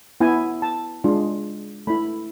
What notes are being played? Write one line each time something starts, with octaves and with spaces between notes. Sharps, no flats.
B3 E4 G#5
A5
G#3 D4 F4
A3 E4 B5